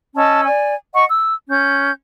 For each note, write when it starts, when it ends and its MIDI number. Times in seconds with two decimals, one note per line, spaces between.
0.15 0.45 61
0.15 0.45 75
0.15 0.45 81
0.15 0.45 88
0.45 0.74 74
0.45 0.74 80
0.93 1.04 75
0.93 1.04 78
0.93 1.04 85
1.08 1.32 88
1.48 1.92 61
1.48 1.92 91